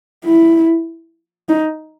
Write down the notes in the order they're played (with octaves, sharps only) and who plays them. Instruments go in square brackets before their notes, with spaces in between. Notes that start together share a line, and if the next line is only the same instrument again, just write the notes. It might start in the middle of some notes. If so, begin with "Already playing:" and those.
[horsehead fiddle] E4
D#4